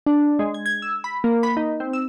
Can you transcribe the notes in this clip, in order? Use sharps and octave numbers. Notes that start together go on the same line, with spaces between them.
D4
G#3
G#6
G#6
E6
B5
A#3
B5
D#4
C4
E6